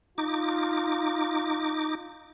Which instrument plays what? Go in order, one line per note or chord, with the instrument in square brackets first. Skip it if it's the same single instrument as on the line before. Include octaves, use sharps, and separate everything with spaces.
[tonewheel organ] D#4 D6 [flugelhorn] F4